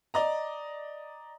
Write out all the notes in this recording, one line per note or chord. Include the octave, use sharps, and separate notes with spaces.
D5 D#5 A#5